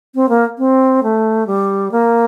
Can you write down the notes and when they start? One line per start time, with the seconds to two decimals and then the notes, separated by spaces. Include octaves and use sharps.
0.15 C4
0.29 A#3
0.58 C4
1.03 A3
1.47 G3
1.92 A#3